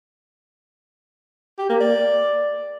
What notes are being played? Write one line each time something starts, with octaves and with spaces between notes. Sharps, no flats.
G4
A#3
D5